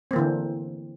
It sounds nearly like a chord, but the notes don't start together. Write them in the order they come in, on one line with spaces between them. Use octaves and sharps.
C4 A#3 E3 D3